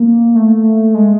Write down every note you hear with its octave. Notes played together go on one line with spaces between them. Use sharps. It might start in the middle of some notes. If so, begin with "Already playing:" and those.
Already playing: A#3
A3
G#3